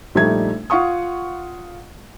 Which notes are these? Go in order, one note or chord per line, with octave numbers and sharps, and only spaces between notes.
A#1 G3 A3 D#4 G#6
F4 F5 F#5 C#6 D#6